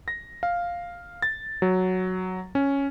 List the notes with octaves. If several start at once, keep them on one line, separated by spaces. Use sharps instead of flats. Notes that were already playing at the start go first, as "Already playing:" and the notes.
A#6
F5
A6
F#3
C#4